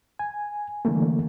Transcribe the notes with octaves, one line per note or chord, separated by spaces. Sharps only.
G#5
D3 E3 G3 A3 A#3